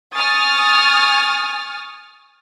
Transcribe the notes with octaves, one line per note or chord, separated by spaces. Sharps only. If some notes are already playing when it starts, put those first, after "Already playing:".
G#5 C#6 D#6 F6 A6